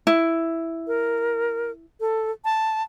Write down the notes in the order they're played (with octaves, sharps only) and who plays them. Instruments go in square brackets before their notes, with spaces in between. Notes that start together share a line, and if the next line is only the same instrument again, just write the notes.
[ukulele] E4
[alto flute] A#4
A4
A5